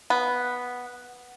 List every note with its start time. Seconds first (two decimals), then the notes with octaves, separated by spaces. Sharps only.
0.10 B3